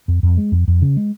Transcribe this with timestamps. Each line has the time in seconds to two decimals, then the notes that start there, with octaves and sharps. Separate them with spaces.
0.08 F2
0.23 F2
0.38 G#3
0.52 F2
0.68 F2
0.82 C#3
0.97 G#3